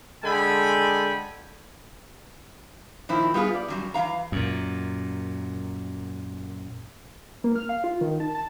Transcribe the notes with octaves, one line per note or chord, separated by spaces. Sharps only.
D3 G#3 A4 G5 G#5 B5
A#2 D#3 F3 C4 E4
G3 B3 F4 G#4
D5
F#2 F#3 G3
E3 B3 F5 A#5
F#2 A#2
A#3
F6
F5
F4
D#3
A5
A5